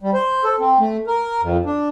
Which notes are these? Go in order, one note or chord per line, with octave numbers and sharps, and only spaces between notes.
G3
C5
A4
C4
A3
A#4
F2
D4